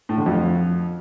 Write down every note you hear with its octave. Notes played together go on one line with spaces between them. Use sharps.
A2
D3
F2